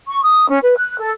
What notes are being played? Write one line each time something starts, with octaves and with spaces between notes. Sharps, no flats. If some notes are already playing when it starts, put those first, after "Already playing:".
C#6
D#6
C#4
B4
F#6
A4